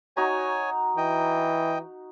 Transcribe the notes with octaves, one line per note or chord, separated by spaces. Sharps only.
D#4 F#4 C#5 G#5 A#5
E3 D#5 G5